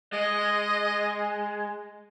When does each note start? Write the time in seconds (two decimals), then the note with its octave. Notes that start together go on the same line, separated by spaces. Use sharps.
0.13 G#3 D#5